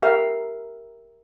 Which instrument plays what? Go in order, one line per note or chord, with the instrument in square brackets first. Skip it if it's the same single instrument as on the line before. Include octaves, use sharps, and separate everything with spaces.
[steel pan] G4 A#4 E5 F5